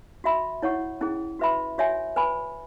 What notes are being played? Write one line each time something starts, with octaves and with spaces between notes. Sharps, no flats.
F#4 E5 B5
E4 C#5 F#5 C#6
C#4 E4 G#4
F#4 B4 E5 B5
F#4 C#5 E5 G#5
B4 G#5 B5